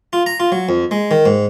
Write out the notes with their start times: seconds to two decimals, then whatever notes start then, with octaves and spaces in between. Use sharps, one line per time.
0.13 F4
0.26 A#5
0.40 F4
0.52 F#3
0.69 F2
0.91 G#3
1.11 D#3
1.26 G#2